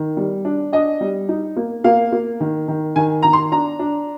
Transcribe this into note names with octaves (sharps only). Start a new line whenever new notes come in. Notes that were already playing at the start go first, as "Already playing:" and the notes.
Already playing: D#3
G3
D4
D4 D#5
G3
D#4
A#3
A#3 F5
A#3
D#3
D#3
D#3 G#5
D#3 A#5
C6
D4 A#5
D4